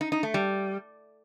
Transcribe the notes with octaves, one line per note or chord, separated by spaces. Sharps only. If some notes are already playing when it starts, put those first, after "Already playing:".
D#4
D#4
A3
G3